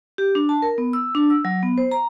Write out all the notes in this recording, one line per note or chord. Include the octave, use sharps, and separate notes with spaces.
G4
D4
A5
A#4
B3
E6
D4
E6
F#3
B3
C5
A#5